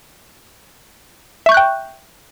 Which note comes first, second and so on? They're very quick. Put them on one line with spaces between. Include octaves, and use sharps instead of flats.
E5 C#6 G6 F#6 G5